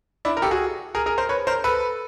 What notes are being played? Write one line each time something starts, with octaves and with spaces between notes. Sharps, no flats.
D4 E4
A#4
G4 A4
F#4 G#4
G#4 A#4
G#4 A#4
A#4 C5
B4 C#5
A#4 C5
A4 B4